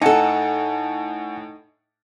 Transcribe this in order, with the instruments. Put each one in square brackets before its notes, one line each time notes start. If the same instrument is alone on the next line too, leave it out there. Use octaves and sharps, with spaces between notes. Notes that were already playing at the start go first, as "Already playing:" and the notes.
[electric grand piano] A2 A5 C#7 [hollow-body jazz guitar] D#4 A4 [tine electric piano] F#5 G#5